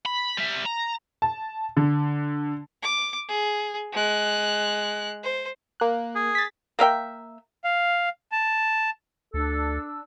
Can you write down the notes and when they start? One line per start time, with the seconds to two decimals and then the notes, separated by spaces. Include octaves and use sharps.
0.06 B5
0.38 G3 E5
0.66 A#5
1.22 A5
1.77 D3
2.83 D6
3.29 G#4
3.93 G#3 F#6
5.23 C5
5.80 A#3 F#6
6.15 G#4
6.35 A6 B6
6.79 A#3 A#4 E5 G5
7.64 F5
8.32 A5
9.34 D2 D4 A4 E6